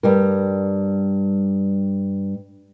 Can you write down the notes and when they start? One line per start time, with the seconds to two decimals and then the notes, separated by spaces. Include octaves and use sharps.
0.03 G2 G3 A#4